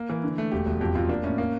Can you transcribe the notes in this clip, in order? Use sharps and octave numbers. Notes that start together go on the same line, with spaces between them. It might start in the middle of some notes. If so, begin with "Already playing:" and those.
Already playing: A#3
E3
D3
A3
E1 G4
E1
F2 G4
F2 F4
A#3 D4
A2 C#4
A#3